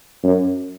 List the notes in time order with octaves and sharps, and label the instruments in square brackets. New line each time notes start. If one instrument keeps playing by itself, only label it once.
[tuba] F#2